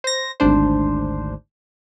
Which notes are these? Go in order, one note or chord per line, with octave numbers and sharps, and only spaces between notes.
C5 A#6
G#1 D2 G#2 D4 C5